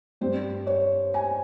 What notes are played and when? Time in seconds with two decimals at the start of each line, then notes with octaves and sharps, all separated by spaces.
0.21 G2 G3 C4 C5
0.67 C#5
1.14 G#5